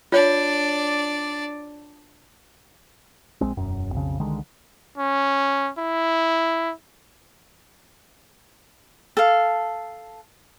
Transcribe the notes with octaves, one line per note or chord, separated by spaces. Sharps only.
D4 F4 C#5 D5
A#1 G#3 C4
E1 F#2
B1 F2 C#3
C2 D3 D#3 G#3
C#4
E4
A4 F5